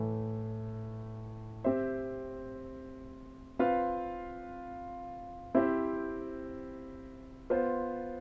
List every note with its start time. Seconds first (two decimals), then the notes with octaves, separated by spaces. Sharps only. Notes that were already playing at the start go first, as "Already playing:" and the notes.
Already playing: A2 E3 A3
1.64 C4 G4 C5 E5
3.59 C4 F4 B4 F5
5.55 C4 E4 G4 C5
7.50 B3 F4 C5